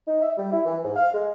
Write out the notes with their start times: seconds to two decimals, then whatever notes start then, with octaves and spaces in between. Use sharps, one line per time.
0.07 D#4
0.21 E5
0.37 G3
0.51 E4
0.65 E3
0.83 G#2
0.96 F5
1.14 G#3